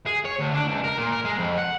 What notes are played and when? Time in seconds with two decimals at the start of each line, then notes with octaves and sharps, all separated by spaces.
0.06 G#4
0.25 C#5
0.40 D2
0.55 D4
0.68 C#2
0.84 A#4
0.98 A#2
1.12 A#4
1.25 G#3
1.38 F2
1.58 F#5